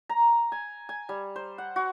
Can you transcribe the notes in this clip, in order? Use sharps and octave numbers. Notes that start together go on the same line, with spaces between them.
A#5
G#5
G#5
G3
C5
F#5
F#4